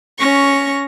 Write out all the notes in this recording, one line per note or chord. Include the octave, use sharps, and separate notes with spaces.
C#4 C#6 A#6